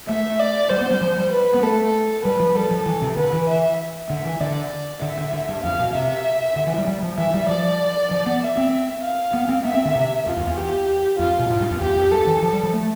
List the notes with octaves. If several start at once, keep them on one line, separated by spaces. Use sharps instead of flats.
A3 E5
D5
G3 C5
B3
G3
F3
G3
B4
B3
A3 A4
G3 B4
F3
G3 A4
F3
E3
C3
D3 B4
E3
E5
D3 E5
E3
D3 D5
D3 E5
D3
D3
G2
F2 F5
B2
C3 E5
D3
E3
G3
G3
F3
E3 E5
G3
F3 D5
F3
B3
E5
C4
F5
B3
C4
B3 E5
C4
D3
C3
F2 F4
E2
E2
G4
F2 F4
B2
A2 F4
G2
F2
E2 G4
F2
G2 A4
E3
F3
G3
F3
A3